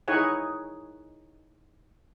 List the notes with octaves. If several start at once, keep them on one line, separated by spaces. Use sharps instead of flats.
D#4 E4 G#4 C#5 F#5 G#5